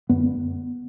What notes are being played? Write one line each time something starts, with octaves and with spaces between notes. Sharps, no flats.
F#2 D3 B3